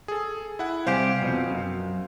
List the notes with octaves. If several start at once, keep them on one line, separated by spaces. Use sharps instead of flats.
G#4 A4
E4 F#5
C2 G4 C5 F5 G#5
F2 B2
F#2